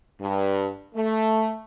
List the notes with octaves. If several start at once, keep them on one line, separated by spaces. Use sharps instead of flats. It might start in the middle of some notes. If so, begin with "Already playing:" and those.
G2
A3